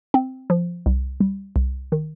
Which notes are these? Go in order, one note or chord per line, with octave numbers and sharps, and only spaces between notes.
C4
F3
C2
G3
C2
D#3